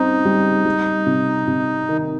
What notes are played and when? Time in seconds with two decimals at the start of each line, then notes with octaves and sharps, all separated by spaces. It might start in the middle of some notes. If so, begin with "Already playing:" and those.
Already playing: C#3 G3 C4 D#4
0.25 G3
0.65 G3
1.06 C3
1.48 C3
1.89 D#3